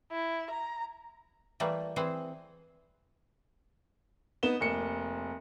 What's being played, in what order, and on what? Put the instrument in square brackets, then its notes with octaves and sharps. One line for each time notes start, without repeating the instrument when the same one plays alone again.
[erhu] E4
A#5
[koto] E3 G3 A3 A#3
E3 C4 G#4 C5
[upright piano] B3 D#4 E7 G7
F1 A#3 C#7